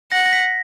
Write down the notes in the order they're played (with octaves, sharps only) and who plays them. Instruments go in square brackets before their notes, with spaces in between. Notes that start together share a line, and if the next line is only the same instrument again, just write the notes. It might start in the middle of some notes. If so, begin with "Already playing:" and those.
[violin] F#5 [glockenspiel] A#6
[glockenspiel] A#6
B6